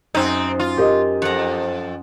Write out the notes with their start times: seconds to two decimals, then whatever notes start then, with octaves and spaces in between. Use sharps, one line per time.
0.15 F#2 C4 D#4
0.59 F4
0.77 G4 A#4 D#5
1.22 F2 F#5 A#5